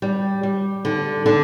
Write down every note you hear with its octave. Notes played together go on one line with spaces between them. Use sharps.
G3
G3
D3
D3